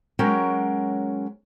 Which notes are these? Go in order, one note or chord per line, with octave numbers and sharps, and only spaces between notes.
F#3 G#3 C#4 F#4 A#4 G5